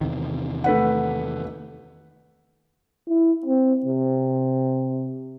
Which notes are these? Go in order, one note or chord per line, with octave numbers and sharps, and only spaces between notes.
E2 C3 D#3
A3 B4 F#5
E4
C4
C3